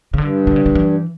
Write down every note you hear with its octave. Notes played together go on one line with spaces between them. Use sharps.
C#3
G2 D3
D3
C#3
D3
E3